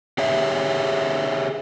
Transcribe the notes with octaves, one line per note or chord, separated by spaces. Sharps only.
G4 G#4 C#5 E5